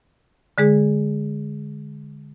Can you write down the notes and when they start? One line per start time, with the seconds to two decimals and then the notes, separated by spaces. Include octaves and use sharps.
0.58 D3 G#3 G#4